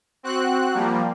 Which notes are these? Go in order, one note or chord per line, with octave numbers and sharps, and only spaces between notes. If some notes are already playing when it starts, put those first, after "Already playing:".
C4 F#4 F#6
F3 G3 A#3